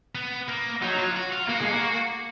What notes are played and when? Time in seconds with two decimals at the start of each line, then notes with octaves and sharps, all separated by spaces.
0.15 B3
0.48 A#3
0.82 F#3 D#4
0.99 F4
1.16 F#4
1.32 F4
1.49 A#3 F#4
1.62 G#3
1.73 A#3